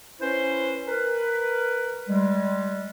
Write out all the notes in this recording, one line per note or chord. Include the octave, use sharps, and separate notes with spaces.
C#4 E4 B4 C5
A#4 B4
G3 G#3